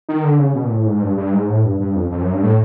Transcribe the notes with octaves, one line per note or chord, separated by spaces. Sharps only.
D#3
D3
C#3
B2
A#2
A2
G#2
G2
G2
G#2
A2
G2
G2
F2
F2
F#2
G2
A2